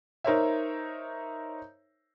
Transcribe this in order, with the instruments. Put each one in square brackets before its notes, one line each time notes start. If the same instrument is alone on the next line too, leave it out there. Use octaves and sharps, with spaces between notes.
[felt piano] D#4 A#4 C5 C#5 E5